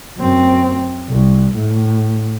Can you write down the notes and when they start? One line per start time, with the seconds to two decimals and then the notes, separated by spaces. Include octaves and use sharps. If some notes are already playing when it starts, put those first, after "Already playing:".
0.18 F#2 C4
1.09 C2
1.54 A2